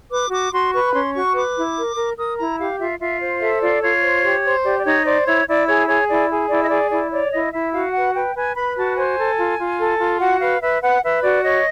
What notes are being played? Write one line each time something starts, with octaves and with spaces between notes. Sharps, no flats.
B4 D6
F#4 D6
F#4 C6
B4 C#6
B5
C#4 C6
F#4 C#6
B4 D6
E4
A#4
A#4
A#4 D#6
E4 A#5
G4 F5
F4 E5
F4 E5
C5
A4 E5
F4 D5
F4 C#5
C5
G4
C5
G4 D5
D5
D#4 C#5
C5 D5
E4 C#5
E4 D5
G#4 C#5
G#4 C#5
E4 D5
G#4
E4 D5
D#5
G#4 D5
E4 D5
C#5 D5
E4 D#5
E4 E5
F#4 F5
B4 F#5
B4 G5
B4 G#5
B4 B5
F#4 A5
C5 G#5
A4
F4
F4
A4
F4
F#4 F#5
B4 F5
B4 E5
B4 F#5
B4 E5
F#4 D5
C#5 D#5